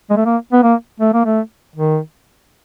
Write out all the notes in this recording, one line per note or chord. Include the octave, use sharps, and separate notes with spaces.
G#3
A3
A#3
B3
A#3
A3
A#3
A3
D#3